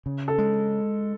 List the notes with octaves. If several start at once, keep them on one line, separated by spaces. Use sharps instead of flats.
C#3
A4
G#3